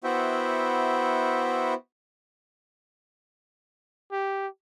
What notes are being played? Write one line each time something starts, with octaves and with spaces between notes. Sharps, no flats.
B3 E4 F#4 C5 E5 G5
G4